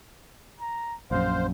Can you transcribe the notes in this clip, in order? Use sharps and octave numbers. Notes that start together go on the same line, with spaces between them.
A#5
A#1 F#2 C5 F5